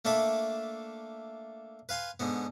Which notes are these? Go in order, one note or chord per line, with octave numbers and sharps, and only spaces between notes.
A3 A#3 D4 A4 E5 B5
B4 F5 G#5 C6
G#2 D3 B3